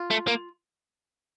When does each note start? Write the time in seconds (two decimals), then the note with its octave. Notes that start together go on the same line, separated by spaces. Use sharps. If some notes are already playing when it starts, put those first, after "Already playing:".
Already playing: F4
0.11 A3
0.28 A#3